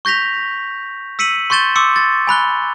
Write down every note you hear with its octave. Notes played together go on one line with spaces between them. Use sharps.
C#6 G6 A#6 B6 F7
E6 B6 C#7 D#7 F#7
C6 C#6 G6 A6 E7 G7
C6 D6 E6 C#7
A6
G#5 B5 F#6 G7